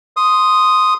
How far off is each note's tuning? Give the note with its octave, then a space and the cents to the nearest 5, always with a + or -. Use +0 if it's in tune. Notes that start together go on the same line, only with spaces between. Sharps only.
C6 +0 D#6 +0